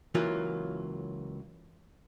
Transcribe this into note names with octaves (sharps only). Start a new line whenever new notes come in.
C#2 E3 F#3 A#3 F4